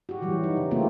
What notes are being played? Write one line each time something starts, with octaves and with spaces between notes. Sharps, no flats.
F#4 G4
E3 F#3 G3
D#4
C#3
A3 A#3 C4 F4